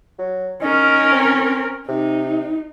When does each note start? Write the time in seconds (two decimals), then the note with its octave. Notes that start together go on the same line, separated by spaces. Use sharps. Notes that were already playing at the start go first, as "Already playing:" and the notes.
0.19 F#3
0.62 C#4 D#4 A#4
1.13 C4
1.89 C3 D#4